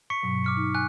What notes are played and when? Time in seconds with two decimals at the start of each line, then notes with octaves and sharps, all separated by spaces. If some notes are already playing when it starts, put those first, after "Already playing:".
0.10 C#6 B6 C#7
0.23 G2 B2 F#3
0.44 D6 F6 C#7
0.57 D#4
0.75 G#5 F#6